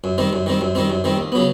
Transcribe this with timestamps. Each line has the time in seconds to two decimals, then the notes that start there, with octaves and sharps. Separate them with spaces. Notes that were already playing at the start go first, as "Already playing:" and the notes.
0.04 F#2
0.18 D#3 G3 C4
0.33 F#2
0.46 D#3 G3 C4
0.61 F#2
0.75 D#3 G3 C4
0.90 F#2
1.04 D#3 G3 C4
1.18 D#2
1.32 C#3 F#3 B3